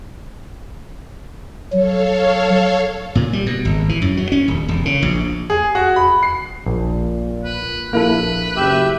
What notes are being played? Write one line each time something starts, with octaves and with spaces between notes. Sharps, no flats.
F#3 A4 C#5 F5
A#2
G3
B2
G#1
E3
F#2
F#3
C#4
D#1
E1
C#3
A#1
G#4
F#4
B5
C7
A#1 A#2
B4
A#1 A#3 E4 A4 B4
F#1 G4 E5